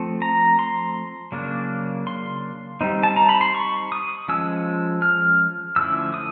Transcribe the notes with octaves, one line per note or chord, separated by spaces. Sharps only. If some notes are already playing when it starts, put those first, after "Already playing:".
Already playing: F3 A3 C4
A#5
C6
C#3 F#3 A#3 D4
C6
G3 C4 D#4
A5
A#5
B5
C6
C#6
D#6
F3 G#3 C#4 E6
F6
D3 F3 A3 C#4 E4 E6
D#6